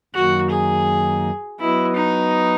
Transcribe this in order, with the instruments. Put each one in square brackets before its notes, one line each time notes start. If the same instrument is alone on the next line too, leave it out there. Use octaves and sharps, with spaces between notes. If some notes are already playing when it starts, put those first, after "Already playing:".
[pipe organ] F#2 D#3 F#3 A#3 D#4 [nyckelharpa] F#4
[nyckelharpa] G#4
[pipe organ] F#3 B3 F#4 B4 D#5 [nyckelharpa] E4
[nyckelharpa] D#4